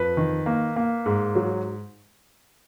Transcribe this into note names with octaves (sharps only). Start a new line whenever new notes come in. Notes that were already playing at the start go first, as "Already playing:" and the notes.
Already playing: F2 B4
D#3
A#3
A#3
G#2
F#3